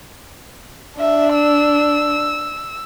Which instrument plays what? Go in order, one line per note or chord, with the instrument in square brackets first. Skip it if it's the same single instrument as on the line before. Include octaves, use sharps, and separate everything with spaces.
[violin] D4 [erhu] E5
[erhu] E6